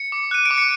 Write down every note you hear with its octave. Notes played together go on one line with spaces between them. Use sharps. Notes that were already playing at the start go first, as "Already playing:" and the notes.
Already playing: C#7
D6
F#6 D#7
D7
D6
C#7